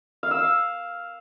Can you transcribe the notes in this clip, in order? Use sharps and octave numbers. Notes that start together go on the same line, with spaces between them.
F5
E6
F5